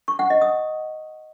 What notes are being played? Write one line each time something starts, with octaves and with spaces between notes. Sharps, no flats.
C#6
F#5
D#5
D#6